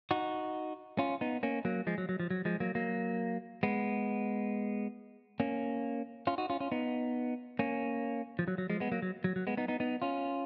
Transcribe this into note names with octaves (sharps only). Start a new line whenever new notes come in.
D#4 F#4
C#4 F4
B3 D#4
A#3 C#4
F#3 A#3
F3 G#3
F#3
F#3
F3
F#3
F3 G#3
F#3 A#3
F#3 A#3
G#3 B3
A#3 C#4
C#4 F4
D#4 F#4
C#4 F4
C#4 F4
B3 D#4
A#3 C#4
F3
F#3
F#3
F3 G#3
G#3 B3
F#3 A#3
F#3
F#3
F#3
G#3 B3
B3 D#4
B3 D#4
B3 D#4
C#4 F4